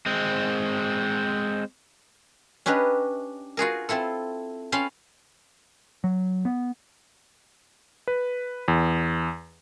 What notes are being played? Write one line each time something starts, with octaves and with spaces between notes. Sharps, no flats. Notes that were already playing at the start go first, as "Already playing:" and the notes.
G#3 C4
C#4 D4 G4 B4 D#5
F4 F#4 G#4 A#4
C4 E4 F4 A4
C#4 F5 G5 A5 B5 C6
F#3
B3
B4
E2